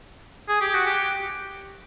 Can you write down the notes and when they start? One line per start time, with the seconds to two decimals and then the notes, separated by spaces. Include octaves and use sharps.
0.49 G#4
0.61 G4
0.74 F#4
0.87 G4